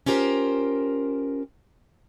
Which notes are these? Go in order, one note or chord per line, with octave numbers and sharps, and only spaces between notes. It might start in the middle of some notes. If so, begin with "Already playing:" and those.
C#4 F4 G4 A#4 C5